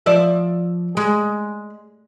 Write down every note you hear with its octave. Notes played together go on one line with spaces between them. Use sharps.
F3 D5 E5
G#3